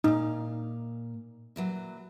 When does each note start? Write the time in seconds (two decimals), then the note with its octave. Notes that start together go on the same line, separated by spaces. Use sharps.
0.04 A#2 D#4 F5
1.56 A#2 E3 F#3